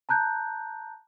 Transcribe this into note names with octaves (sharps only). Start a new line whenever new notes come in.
A5 A#5 F#6 G6